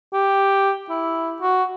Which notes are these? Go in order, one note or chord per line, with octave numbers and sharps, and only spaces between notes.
G4
E4
F#4